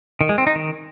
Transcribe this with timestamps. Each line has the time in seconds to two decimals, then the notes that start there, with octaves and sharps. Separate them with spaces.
0.21 D#3
0.29 G#3
0.38 C4
0.47 D#4
0.55 D#3